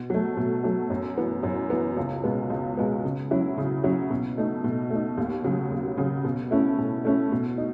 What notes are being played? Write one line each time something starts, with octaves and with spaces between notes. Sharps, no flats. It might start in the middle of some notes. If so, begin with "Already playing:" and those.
Already playing: B2
F#3 A3
B2
F#3 A3
F#2
E3 B3
F#2
E3 B3
C#2
B2 G#3 B3
C#2
B2 G#3 B3
C#3
F#3 C#4 E4
C#3
F#3 C#4 E4
B2
A3 D#4
B2
A3 D#4
D#2
C#3 F#3
D#2
C#3 F#3
B2
A3 C#4 E4
B2
A3 C#4 E4
B2
D#4